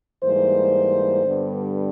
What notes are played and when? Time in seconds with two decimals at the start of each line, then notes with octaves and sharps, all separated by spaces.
0.24 G#2 E3 G3 A#3 C5
1.25 G2 D3 G3 B3